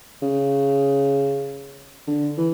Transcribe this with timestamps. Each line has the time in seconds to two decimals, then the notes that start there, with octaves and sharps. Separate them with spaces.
0.22 C#3
2.07 D3
2.38 E3